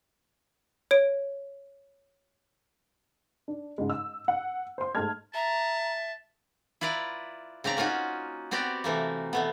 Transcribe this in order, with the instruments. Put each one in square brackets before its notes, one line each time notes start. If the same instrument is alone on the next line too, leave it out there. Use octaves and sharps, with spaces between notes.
[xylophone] C#5 D7
[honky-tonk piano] D4
G#2 C#3 G#3
E6
F#5
C5 C6
G#2 G#3 A3 A5 F6 G#6
[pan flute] E5 [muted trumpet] A5 [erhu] A#5
[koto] E4 F4 B4 D5 A#5
C#3 C4 D5 A#5
A#3 C#4 D#4 F4 F#4
B3 C4 F#4 G4 D5
C3 E3 A3 A#3
B2 A3 B3